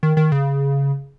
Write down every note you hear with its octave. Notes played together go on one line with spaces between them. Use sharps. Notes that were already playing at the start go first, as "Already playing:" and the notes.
D#3
D#3
C#3